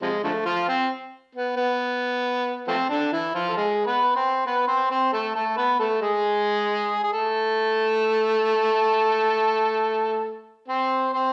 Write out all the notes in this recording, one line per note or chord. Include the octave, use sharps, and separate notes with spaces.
C3 F3 G#3
D3 F3 A3
F3 F4
C4
B3
B3
F3 A3 C4
D3 D4
E3 E4
F3 F4
A4
G#3 G#4
B3 B4
C4 C5
B3 B4
C4 C5
C4 C5
A3 A4
A3 A4
B3 B4
A3 A4
G#3 G#4
G#4
A3 A4
C4 C5
C4 C5